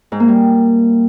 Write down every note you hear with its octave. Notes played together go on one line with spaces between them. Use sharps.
G#2
A#3
G3